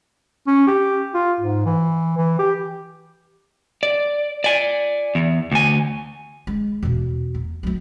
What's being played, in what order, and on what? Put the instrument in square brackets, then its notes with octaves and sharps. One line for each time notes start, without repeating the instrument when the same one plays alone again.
[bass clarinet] C#4
G4
F4
G#2
E3
E3
G4
[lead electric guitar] D5
D5 G#5
E2
D2 G#5
[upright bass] G#3
E2 B2
A#3
F#3 A3